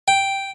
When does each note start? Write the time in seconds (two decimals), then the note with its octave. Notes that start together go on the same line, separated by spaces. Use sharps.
0.08 G5